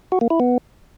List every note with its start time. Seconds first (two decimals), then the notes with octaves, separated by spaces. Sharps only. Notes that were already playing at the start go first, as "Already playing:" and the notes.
0.12 F#4
0.21 A#3
0.30 E4
0.40 B3